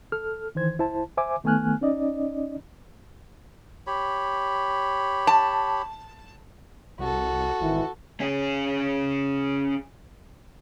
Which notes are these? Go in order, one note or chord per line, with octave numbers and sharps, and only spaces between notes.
A4 F6
D#3 E3 C5 G#6
C#2 E4 C5 A5
C5 E5 G#5 D6
D#3 A3 B3 G#5 F6 F#6
C#4 D#4 D5 D#5
G4 C#5 B5
A5
C2 F#4 A4
G#1 D#3 E3
C#4 G#4